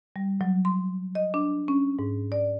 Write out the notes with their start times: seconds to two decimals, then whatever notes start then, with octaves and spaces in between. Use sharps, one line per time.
0.16 G3
0.41 F#3
0.65 C6
1.15 D#5
1.34 D4
1.68 C#4
1.99 G#2
2.32 D5